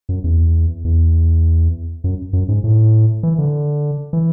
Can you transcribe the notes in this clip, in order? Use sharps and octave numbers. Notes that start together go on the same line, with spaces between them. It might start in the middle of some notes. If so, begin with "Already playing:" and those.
F#2
E2
E2
F#2
F#2
G#2
A2
E3
D3
E3